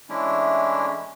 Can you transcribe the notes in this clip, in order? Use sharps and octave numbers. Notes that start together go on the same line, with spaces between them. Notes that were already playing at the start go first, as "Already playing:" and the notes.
E3 G#3 A3 C#4 D4 E4